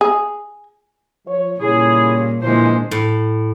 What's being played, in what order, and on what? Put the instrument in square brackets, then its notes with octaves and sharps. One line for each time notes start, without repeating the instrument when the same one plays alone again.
[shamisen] G#4
[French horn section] F3 C#5
[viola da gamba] A#2 [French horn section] C#3 G3 C#5 [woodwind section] E4 G#4
[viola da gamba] A#2 D3 G#3 [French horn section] E3 F3 [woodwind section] C5
[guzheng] A2